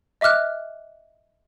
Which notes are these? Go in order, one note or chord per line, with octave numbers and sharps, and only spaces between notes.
D#5 E5 D6 F6 F#6